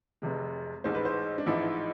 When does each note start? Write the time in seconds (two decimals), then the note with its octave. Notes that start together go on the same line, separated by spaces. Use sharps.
0.22 F1 F2 C3 G#3
0.84 A1 G#2 G#3 C5
0.95 B4
1.05 C5
1.38 D4
1.46 A1 G#2 F3 E4